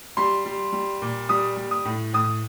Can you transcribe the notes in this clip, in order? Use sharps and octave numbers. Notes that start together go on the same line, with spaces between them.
G3 C6
G3
G3
A#2
G3 D#6
G3
D#6
A2
A2 D#6